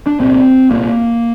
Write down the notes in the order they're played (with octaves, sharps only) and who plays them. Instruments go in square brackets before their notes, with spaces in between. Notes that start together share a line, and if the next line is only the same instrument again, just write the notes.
[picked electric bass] D4
C2 A#2 C4
C2 A#2 A#3